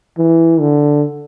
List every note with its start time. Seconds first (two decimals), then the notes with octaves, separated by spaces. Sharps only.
0.18 E3
0.60 D3